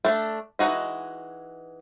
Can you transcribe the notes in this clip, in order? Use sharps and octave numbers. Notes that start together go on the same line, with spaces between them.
A3 D4
E3 G#3 D#4 F#4 D#5